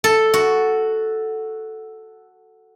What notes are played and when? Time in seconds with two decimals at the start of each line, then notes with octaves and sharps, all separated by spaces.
0.04 A4
0.34 F#4